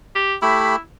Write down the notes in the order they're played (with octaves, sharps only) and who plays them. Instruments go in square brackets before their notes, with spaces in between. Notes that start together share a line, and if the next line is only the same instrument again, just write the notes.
[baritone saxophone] G4
[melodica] A3 G4 B5 [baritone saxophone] E4